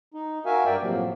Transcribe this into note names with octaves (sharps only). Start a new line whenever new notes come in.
D#4
F#4 A#4 E5 F5 G#5
G2 A#4 D5 E5 G5
A2 C3 F3 F#3 A#3